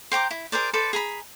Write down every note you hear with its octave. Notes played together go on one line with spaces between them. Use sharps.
C5 G5 A#5 D6
E4
G#4 A#4 C5 D5
A4 B4 C5 D5
G#4 A#5 B5